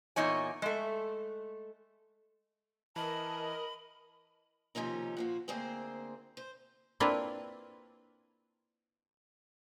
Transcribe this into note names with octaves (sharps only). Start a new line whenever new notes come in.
E2 A#2 D#4 C#5 G#5
G#3 A3
E3 A#4 D#5 A5 B5
D#2 C3 F3 C#4 D#4
A#2 F3 F#4
D2 A#3 C4 G#4 C5
C5
A#3 C4 D4 E4 F4 B4